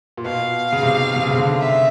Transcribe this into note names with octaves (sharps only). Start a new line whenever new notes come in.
A#2
B2 F5
C#3
C3
B2
C3
C#3
C3
D3
E5